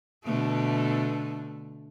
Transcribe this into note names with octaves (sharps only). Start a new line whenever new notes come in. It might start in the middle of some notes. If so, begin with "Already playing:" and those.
B2 D3 A3